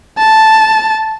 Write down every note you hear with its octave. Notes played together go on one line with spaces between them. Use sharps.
A5